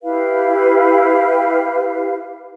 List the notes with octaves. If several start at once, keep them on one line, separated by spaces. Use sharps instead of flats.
E4 G4 B4 F5